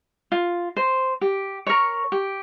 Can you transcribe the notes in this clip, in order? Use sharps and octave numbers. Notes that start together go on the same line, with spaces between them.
F4
C5
G4
A#4 C#5 C#6
G4